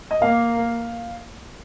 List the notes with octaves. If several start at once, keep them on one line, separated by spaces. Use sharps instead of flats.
D#5
A#3 F5